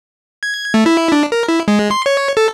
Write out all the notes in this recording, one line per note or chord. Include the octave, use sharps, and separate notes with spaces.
G#6
A3
E4
D4
A#4
E4
G#3
C6
C#5
A4